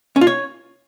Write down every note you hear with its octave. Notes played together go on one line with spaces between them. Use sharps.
C#4
F4
C#5